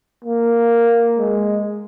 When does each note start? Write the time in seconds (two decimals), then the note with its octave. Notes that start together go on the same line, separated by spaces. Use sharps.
0.24 A#3
1.18 G#3